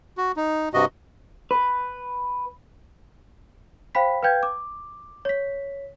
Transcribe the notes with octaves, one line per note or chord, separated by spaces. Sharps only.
F#4
D#4
G2 C3 F#4 D#5
B4
C5 F5 G5 B5 B6
B4 F5 G5 G6 G#6
D6
C#5 B6